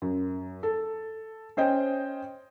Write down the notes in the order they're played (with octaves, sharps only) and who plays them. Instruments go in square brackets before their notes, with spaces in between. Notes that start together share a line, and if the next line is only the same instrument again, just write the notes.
[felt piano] F#2
A4
C#4 C5 D#5 G5